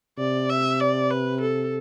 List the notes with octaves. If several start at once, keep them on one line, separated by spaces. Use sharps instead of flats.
C3 D5
E5
D5
B4
A4